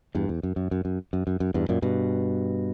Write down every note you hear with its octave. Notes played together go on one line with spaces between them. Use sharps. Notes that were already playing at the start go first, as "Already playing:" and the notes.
E2 G2
E2
F#2
F#2
F#2
F#2
F#2
F#2
F#2
E2 G2
F#2 A#2
G2 B2